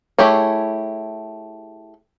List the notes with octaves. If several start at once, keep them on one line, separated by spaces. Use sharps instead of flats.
A3 E4 G4 G#4 C#5